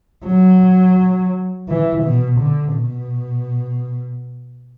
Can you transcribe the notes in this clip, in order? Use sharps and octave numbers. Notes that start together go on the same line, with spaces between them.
F#3
E3
B2
D3
B2